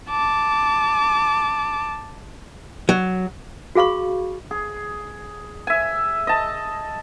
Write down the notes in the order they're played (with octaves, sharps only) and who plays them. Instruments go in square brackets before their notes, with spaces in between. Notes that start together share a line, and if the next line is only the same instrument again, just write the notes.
[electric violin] A5 D6
[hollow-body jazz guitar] F#3
[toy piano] F#4 G#4 F5 B5 C#6
[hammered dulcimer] G#4
E5 G#5
D#5 A5